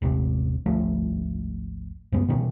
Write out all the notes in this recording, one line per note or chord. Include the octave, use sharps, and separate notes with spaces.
D#1 G#1 C3
G#1 D2 F3 A3
C#2 F#2 B3
B2 D#3 E3